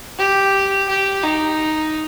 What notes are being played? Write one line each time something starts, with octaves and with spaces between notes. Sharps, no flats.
G4
G4
D#4